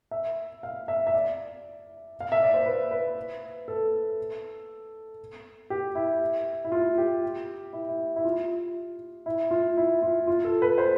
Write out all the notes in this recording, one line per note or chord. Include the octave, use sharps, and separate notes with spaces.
E5
F5
E5
E5
D5
F5
E5
D5
C5
B4
B4
A4
G4
E4
E4
F4
G4
E4
E4
E4
F4
E4
F4
E4
F4
F4
A4
B4
C5